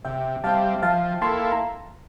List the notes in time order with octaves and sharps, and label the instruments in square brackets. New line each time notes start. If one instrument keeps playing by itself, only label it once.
[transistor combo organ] C3 [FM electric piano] E5 G5
[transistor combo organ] G3 C4 [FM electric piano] F5 A5
[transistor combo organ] F3 [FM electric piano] F5 A5
[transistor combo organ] A#3 E4 A4 [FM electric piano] A5 C6
[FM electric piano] A#5